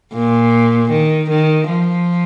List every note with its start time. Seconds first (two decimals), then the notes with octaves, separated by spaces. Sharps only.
0.13 A#2
0.91 D#3
1.30 D#3
1.69 F3